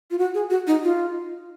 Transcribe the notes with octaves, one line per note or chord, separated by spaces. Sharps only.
F4
F#4
G#4
F#4
D#4
F4